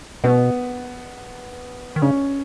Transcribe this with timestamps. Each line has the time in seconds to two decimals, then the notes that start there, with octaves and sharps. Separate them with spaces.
0.24 B2 B3
1.96 D#3
2.02 C#3 C#4